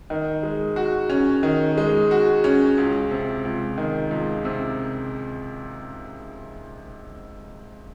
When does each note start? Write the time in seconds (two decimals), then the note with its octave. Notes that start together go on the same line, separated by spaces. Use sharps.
0.10 D#3
0.43 G#3
0.76 F#4
1.10 C#4
1.43 D#3
1.77 G#3
2.11 F#4
2.44 C#4
2.78 C#2
3.11 C3
3.45 C#2
3.78 D#3
4.11 C#2
4.45 C3